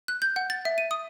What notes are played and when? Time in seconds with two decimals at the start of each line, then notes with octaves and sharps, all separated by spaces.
0.08 F#6
0.22 G6
0.36 F#5
0.50 A6
0.65 E5
0.78 D#7
0.91 D#6